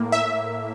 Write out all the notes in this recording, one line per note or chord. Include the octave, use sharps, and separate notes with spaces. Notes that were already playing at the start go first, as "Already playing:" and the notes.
Already playing: A2 A#3
E5